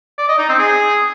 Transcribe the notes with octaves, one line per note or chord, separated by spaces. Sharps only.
D5
D#5
D#4
C4
G#4